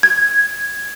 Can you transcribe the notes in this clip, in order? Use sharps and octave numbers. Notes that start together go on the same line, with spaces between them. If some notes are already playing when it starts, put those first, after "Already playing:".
G#6